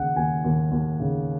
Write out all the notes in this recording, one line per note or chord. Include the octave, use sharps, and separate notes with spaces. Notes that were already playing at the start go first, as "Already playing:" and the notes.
Already playing: D#2 C#3 F#5
D#2 G#5
D#2
D#2
C#3